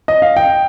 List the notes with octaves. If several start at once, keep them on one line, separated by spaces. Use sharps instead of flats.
D#5
F5
G5